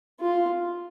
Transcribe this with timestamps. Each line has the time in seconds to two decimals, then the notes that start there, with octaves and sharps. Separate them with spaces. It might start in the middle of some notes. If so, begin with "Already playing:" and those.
0.20 F4